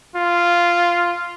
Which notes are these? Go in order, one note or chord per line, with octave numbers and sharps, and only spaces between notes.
F4